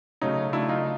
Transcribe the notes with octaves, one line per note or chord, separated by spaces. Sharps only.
C#3 F#3 A3 C#4 D#4
C#3 F#3 A3 D4 E4
D#4 F4